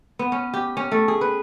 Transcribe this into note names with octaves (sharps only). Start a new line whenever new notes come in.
B3
C#4
G4
C#4
A3
G#4
B4